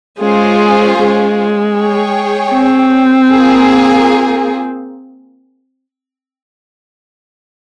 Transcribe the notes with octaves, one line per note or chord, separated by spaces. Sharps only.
G#3 C#4 F4 G#4 C5
G#3
G#4 C#5 G5
C4
A#3 F4 G#4